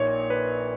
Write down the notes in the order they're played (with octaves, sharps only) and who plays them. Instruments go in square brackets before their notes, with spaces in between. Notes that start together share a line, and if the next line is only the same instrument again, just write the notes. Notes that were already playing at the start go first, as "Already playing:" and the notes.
Already playing: [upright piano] A#1 A#2 D#4 [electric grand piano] C#5
[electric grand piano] B4